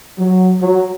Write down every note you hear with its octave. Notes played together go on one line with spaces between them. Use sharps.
F#3
F#3